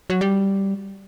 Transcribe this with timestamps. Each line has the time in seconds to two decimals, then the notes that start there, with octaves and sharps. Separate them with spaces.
0.10 F#3
0.21 G3